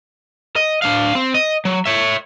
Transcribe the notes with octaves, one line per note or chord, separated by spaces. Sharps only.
D#5
D4 F5
C4
D#5
F#3
C#5 E5